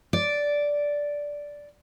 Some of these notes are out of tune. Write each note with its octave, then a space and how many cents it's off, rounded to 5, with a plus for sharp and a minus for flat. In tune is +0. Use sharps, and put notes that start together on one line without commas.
D5 -5